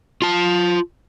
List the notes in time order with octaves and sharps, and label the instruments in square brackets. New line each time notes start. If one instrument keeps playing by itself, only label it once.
[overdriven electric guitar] F4 A5